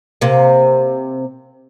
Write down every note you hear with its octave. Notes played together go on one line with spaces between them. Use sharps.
C3 A#3